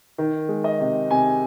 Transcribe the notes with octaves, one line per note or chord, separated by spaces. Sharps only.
D#3
G#3
D#5
C3
C3 G#5